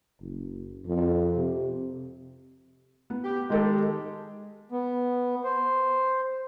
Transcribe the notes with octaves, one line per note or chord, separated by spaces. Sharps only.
F#1
F2
C3
B3
G4
D#3 G#3 G4 A4
B3
C5